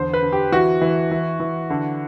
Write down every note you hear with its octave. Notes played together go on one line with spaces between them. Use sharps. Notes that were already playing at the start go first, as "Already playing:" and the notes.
Already playing: E2 D3 C5
B4
D3
G4
E3 F#4
E3
E3
E3
D3